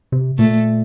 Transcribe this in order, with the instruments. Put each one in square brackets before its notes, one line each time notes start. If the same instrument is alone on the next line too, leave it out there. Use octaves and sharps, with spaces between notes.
[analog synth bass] C3
[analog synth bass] A#2 [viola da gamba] A3